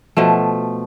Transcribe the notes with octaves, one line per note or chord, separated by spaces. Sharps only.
B2 F3 A3